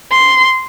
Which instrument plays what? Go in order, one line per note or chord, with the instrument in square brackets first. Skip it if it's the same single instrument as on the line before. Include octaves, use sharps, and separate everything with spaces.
[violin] C6